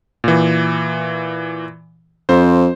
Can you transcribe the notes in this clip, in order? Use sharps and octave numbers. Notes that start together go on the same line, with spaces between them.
A#2 E3
F2 C5